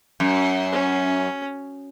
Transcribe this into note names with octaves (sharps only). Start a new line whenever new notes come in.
F#2
C#4